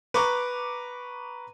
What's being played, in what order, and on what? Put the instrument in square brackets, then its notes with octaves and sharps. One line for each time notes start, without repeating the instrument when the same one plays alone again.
[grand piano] B4 A#5 C#6 D6